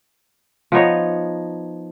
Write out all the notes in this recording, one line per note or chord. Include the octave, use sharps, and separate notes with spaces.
F3 B3 D#4 C#5